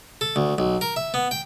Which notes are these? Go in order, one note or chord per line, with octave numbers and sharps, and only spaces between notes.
A4
D2
B1
A#4
E5
B3
G5